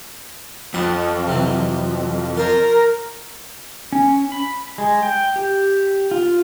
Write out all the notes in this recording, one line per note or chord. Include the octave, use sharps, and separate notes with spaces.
F2 F#5 A5
C3 E3 F#3
F4 A#4 C5 C#5
C#4
B5
G#3
G5
G4
F4